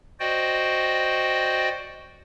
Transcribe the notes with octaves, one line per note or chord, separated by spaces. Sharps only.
F#4 C5 D5 D#5 G5